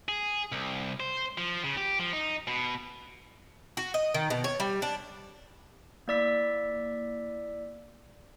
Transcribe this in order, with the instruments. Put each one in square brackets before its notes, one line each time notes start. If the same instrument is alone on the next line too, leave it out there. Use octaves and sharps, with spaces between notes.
[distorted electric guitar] G#4
C2
C5
F3
C#3
G4
F3
D#4
B2
[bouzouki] F#4
D#5
D#3
B2
C#5
G3
D4
[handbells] A#3 E4 D5 E6 B6